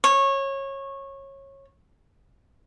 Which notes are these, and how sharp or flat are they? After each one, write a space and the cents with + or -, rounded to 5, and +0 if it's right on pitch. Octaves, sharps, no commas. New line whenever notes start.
C#5 -20